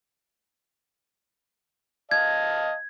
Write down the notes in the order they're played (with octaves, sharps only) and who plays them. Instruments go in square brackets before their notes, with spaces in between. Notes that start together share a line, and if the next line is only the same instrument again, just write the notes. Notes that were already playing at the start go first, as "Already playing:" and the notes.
[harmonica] D#5 F5 A5 [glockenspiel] G#6